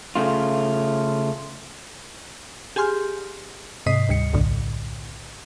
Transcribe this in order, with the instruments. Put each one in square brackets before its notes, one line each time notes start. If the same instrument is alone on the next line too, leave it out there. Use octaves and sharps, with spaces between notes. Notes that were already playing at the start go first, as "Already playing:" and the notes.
[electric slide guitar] C#3 A3 F4
[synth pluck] G4 G#4 G#5 C6 F6 G6
G#2 C3 D#5 D#6 B6 C7
D2 G3 C#7
B1 F#2 A2 D3